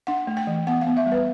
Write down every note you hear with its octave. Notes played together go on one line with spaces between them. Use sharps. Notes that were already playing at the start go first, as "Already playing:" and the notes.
D4 F#5
A3
G5
E3
B3 F#5
F5
B3
E5
G3
B4